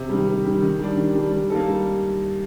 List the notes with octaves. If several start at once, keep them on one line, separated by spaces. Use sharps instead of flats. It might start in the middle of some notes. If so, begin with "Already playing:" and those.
Already playing: C3
D#3 G3
C3
D#3 G3
D#3
G3 D4
D#3
G3 D4
G3
A#3 D#4 A4
G3